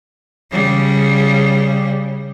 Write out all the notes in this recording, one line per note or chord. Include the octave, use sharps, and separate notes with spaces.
C#3 G3